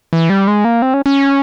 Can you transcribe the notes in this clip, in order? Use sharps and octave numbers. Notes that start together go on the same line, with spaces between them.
E3
G3
G#3
A#3
C4
C#4
C#4